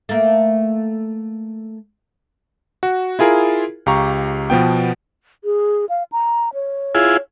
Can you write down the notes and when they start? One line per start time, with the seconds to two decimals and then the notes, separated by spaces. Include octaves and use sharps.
0.09 A3 A#3
2.83 F#4
3.19 E4 F4 G#4 A#4
3.86 C#2 G4 F5 A#5 C#6
4.50 B2 F3 B3 G5
5.44 G#4
5.89 F5
6.12 A#5
6.54 C#5
6.95 E4 F4 G#4